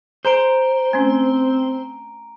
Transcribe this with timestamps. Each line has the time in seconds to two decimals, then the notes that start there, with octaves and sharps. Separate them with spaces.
0.25 G#4 C5 G#5 A#5 D7
0.93 A3 C4 C#4